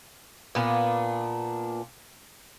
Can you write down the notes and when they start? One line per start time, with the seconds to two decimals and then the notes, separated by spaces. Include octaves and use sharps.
0.55 A#2 B3 D4